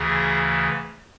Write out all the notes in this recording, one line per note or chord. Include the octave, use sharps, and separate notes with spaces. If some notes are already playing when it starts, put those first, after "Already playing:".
Already playing: D2 C#3 E3 G#4